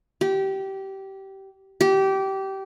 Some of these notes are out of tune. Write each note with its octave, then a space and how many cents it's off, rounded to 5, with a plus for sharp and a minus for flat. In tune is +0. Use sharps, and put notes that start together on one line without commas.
G4 -20
G4 -20